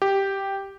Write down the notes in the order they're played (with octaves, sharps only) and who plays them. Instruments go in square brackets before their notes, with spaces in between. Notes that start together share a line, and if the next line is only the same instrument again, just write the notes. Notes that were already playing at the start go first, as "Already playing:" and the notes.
[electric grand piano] G4